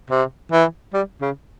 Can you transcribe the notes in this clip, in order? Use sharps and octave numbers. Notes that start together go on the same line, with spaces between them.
C3
E3
G3
C#3